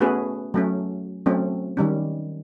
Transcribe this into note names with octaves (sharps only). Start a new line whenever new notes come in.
A3 B3 C#4 F#4 G#4 B4
F#3 A3 C#4
F#3 A3 C4 C#4
D#3 G3 C#4